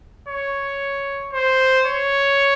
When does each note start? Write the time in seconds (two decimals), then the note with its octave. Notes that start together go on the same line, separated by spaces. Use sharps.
0.29 C#5
1.33 C5
1.86 C#5